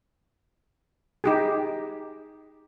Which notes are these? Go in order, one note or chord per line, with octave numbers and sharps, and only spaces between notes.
D#4 G4 G#4